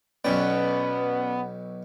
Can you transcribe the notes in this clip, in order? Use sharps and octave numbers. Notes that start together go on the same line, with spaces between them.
B1 B2 B3 C#4 D5 G5